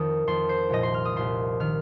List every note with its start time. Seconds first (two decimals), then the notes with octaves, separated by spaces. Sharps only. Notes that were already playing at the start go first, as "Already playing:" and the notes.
Already playing: F2 D#3 D#6
0.27 F2 D#3 C6
0.49 C5
0.69 C2 A#2 F3 D#5
0.83 C6
0.94 F6
1.05 D#6
1.16 C2 A#2 F3 C6
1.60 D#3 F6